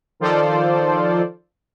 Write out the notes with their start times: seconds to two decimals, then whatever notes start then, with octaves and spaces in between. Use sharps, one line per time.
0.20 D#3 F3 F4 A4 C5 D5